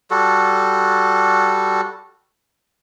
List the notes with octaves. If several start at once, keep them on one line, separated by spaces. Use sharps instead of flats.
G3 F#4 A4